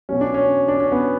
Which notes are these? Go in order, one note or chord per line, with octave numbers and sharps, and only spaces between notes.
B2 F#3 C#4
D4
C#4
D4
C#4
B3